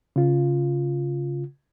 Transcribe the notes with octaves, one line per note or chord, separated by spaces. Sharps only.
C#3 F4